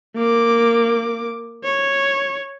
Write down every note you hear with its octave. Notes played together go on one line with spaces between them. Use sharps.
A#3 D6
C#5